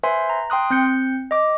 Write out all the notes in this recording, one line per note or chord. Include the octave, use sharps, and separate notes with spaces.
B4 C5 E5 G#5 C6
A#5
G5 C6 D#6 F#6
C4 G6 C#7
D#5 D6